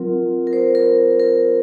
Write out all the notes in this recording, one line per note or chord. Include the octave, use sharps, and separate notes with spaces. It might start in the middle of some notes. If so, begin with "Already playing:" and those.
Already playing: F#3 C4 F4 A#4
A#4
C5
A#4
A#4